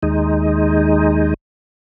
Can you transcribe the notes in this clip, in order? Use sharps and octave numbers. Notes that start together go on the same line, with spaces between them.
D#2 G#3 D#4